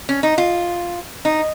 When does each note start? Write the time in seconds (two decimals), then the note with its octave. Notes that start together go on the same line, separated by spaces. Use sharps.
0.09 C#4
0.23 D#4
0.38 F4
1.25 D#4